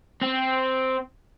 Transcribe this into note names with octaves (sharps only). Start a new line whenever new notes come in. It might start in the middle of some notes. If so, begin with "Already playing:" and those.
C4